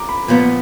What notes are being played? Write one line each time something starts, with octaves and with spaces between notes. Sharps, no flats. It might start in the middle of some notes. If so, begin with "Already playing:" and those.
Already playing: A#5 D6
B5
A#2 F3 B3